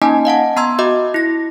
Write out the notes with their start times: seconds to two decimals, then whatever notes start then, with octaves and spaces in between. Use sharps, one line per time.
0.02 A#3 C#4 D#4 D#5 G#5 A5
0.25 D#5 F5 F#5 A5
0.56 B3 A#5 C6 E6 G#6
0.79 F#4 D#5 E5 D6
1.14 E4 A#6